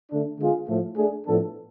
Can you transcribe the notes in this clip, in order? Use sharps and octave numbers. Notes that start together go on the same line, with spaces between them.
D3 A3 D4
D3 G#3 B3 F4 G#4
A2 F3 A3
A3 D4 G#4
A2 F3 B3 D4 A4